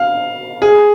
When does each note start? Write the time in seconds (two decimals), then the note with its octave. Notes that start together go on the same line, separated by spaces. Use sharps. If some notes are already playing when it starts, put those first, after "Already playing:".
Already playing: F5
0.62 G#4